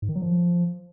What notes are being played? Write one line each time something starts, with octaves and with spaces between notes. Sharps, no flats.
G#2
D#3
F#3
F3